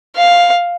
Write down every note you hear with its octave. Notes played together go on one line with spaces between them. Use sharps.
F5